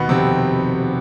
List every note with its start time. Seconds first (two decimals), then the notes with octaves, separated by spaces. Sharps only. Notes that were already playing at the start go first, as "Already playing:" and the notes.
Already playing: D#2 B2 B3
0.09 F1 C3 C4